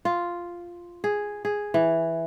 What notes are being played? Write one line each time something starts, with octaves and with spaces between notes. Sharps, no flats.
F4
G#4
G#4
E3